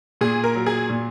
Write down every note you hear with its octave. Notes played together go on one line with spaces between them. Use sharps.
A#2 G#4
A#4
F#3
G#4
A#2